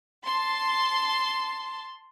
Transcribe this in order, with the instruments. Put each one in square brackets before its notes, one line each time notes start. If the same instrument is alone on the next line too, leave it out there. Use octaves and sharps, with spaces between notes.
[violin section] A5 C6